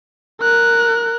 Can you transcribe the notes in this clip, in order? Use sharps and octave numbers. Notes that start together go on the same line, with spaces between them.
A#4 F#6